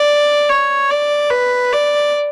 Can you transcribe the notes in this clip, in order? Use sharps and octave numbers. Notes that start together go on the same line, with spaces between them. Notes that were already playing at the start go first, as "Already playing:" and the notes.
Already playing: D5
C#5
D5
B4
D5